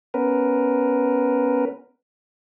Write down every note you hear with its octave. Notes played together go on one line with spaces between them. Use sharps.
B3 C#4 A#4 B4